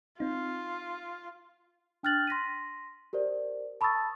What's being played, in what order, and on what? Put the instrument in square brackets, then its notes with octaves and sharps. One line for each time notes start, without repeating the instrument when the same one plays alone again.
[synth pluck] C4 D#4 [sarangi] F4
[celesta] D4 G5 F6 F#6 A6 F#7
C6 A#6 B6 D#7
G4 A#4 C5 D5
A5 B5 C#6 D#6 E6 A6